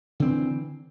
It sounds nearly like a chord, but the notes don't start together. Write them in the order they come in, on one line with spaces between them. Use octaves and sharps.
D3 C4 E3